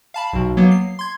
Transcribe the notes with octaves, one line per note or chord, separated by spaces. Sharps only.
F5 A5 B5
B1 B2
F#3 A#3 B3
C7
C6 G#6